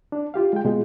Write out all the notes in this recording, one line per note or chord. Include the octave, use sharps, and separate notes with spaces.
D4
F4 G4 F5
G#3 G5
B2 G#3 F4 G#4